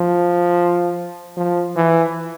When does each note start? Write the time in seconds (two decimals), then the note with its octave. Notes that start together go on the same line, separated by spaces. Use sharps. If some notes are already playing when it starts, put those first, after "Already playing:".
Already playing: F3
1.37 F3
1.76 E3